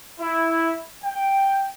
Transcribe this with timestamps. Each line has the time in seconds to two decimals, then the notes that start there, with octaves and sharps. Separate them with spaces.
0.20 E4
1.04 G5